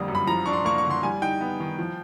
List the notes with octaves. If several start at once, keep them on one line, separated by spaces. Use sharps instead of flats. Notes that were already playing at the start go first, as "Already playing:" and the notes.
Already playing: F2 D3 G3 A#3 D#6
F#2
B5
F3 A#5
D4 C#6
C6
A#3 C#6
C#6
D3
C6
G3 G#5
D#4 G5
B3
D#3
F3